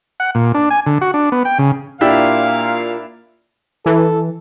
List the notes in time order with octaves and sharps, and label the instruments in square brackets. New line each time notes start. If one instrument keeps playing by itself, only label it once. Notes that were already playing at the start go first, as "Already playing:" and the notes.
[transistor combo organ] F#5
A#2
D4
G#5
D3
F#4
D4
B3
G5
C#3
[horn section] A#2 F5 [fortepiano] D4 E4 G4
[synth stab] E3 [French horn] A4